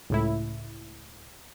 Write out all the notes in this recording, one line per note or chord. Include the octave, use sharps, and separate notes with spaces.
C#2 A2 E4